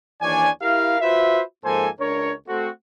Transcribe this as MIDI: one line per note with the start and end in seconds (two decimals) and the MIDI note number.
0.22 0.49 39
0.22 0.49 52
0.22 0.49 62
0.22 0.49 73
0.22 0.49 74
0.22 0.49 80
0.62 0.97 64
0.62 0.97 67
0.62 0.97 70
0.62 0.97 77
1.01 1.42 65
1.01 1.42 66
1.01 1.42 71
1.01 1.42 72
1.01 1.42 76
1.65 1.89 44
1.65 1.89 53
1.65 1.89 58
1.65 1.89 69
1.65 1.89 72
1.65 1.89 80
2.01 2.34 37
2.01 2.34 62
2.01 2.34 70
2.01 2.34 73
2.48 2.69 57
2.48 2.69 60
2.48 2.69 66